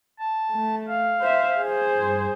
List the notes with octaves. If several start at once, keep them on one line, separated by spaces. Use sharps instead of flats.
A5
A3
F5
C5 E5
G#4 C5
G2